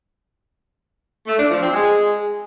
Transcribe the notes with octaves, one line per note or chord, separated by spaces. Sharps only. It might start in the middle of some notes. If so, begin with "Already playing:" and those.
A3
D4
F3
C4
G#3